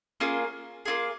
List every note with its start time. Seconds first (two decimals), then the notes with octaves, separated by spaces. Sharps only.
0.20 A#3 C#4 F4 G#4
0.85 A#3 C#4 F4 G#4